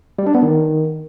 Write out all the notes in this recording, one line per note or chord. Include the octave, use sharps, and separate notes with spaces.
G3
D4
B3
D#3